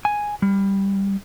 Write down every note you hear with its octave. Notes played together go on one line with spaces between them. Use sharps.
G#5
G3